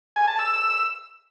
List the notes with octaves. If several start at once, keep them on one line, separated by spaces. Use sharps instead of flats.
G#5
A5
E6